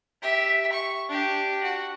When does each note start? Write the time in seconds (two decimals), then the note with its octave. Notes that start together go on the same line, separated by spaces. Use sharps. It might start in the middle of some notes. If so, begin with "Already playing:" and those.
0.22 G4 E5
0.73 C#6
1.09 D4 G4
1.63 F#4